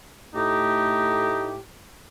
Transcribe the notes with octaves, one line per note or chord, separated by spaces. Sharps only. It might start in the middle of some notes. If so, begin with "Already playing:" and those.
A2 A3 D#4 G4